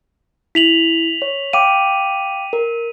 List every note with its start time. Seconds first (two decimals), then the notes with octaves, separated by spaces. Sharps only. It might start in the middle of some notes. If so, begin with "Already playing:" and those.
0.55 E4 B6 F7 F#7
1.22 C#5
1.53 F5 G5 D6 D#7
2.53 A#4